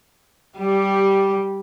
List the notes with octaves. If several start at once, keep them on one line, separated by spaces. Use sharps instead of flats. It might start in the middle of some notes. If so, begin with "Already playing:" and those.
G3 G4